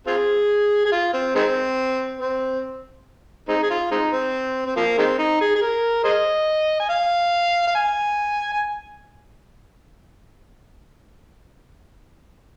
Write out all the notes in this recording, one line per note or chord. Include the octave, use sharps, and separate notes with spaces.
C4 F4 G#4
G#4
F4
C4
D#3 G#3 C4
C4
G#3 C4 D#4
G#4
F4
G#3 C4 D#4
C4
C4
F3 A#3
D#3 G#3 C4
D#4
G#4
G#4
A#4
G#4 C5 D#5
G#5
F5
F5
G#5
G#5